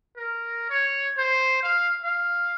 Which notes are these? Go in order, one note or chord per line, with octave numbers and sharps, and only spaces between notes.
A#4
C#5
C5
F5
F5